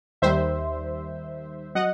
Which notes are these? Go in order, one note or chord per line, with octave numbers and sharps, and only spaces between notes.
D#2 D#3 G3 C5 E5
F#3 D#5 F#5